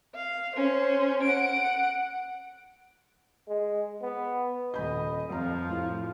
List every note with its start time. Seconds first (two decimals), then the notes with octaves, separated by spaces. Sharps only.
0.15 F5
0.56 C#4 C5
1.23 F#5 D7
3.48 G#3
4.02 B3
4.74 D#1 D#5 B5 G6
5.30 F2 F3 A#5
5.69 A2 E4 F4